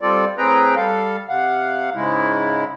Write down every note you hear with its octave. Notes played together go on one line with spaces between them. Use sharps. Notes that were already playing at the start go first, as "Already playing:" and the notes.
G3 C4 F4 A4 D5
A2 C4 G#4 B4 G5 A#5
G3 A4 F5
C3 F5 F#5
G#2 C#3 G#3 E4